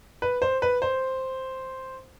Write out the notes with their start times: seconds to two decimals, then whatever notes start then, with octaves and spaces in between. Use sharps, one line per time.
0.22 B4
0.42 C5
0.62 B4
0.82 C5